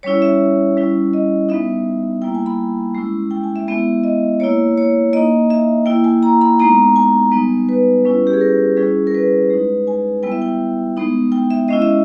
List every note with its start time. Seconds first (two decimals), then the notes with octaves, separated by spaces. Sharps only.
0.03 G3 C#4 E4 C#5
0.22 E5
0.77 G3 C#4 E4
1.13 D#5
1.49 G3 B3 D#4 E5
2.22 G3 A#3 E4 G5
2.35 G#5
2.46 B5
2.95 G#3 C#4 E4
3.31 G5
3.43 G#5
3.56 E5
3.67 G#3 B3 E4 E5
4.04 D#5
4.40 A#3 E4 C#5
4.78 C#5
5.13 A#3 D#4 D#5
5.50 E5
5.86 A#3 E4 G5
6.04 G#5
6.23 A#5
6.41 B5
6.59 G#3 B3 D#4 A#5
6.96 G#5
7.32 G3 B3 D#4
7.69 B4
8.05 G3 C#4 E4
8.27 G4
8.33 G#4
8.41 A#4
8.77 G3 C#4 E4 G#4
9.07 A#4
9.15 B4
9.50 G#3 D#4
9.87 G#5
10.23 G3 B3 E4 G5
10.32 E5
10.42 G5
10.97 G#3 B3 D#4
11.32 G5
11.51 E5
11.68 G#3 C#4 E4 D#5
11.82 E5